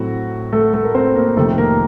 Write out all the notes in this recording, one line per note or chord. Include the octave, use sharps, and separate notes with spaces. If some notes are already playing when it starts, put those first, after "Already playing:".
Already playing: A2 F#3 A3 C4 F#4
A3 A4
A3 A4
A#4
C4 C5
A#3 A#4
F2 C3 D#3 A3 A4
A#3 A#4